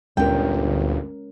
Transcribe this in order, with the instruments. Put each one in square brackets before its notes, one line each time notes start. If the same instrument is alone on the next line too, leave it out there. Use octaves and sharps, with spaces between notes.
[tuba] G1 [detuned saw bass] D2 [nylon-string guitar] A#2 G5 [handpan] G#3 C#4 A#4